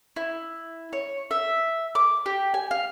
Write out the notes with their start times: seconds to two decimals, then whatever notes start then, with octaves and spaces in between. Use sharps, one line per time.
0.16 E4
0.93 C#5
1.31 E5
1.95 D6
2.26 G4
2.54 G#5
2.71 F5